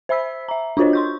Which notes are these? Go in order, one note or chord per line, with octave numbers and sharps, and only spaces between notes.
C5 E5 B5 E6 B6
E5 A#5
D4 F4 F#4 C5 C#5 D#5
C6 C#6 G6